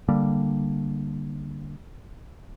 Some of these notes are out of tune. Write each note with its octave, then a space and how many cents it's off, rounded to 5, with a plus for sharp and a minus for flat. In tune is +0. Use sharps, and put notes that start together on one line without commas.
D3 +0 G3 +0 A#3 +0